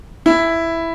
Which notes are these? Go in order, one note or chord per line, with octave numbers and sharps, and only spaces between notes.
E4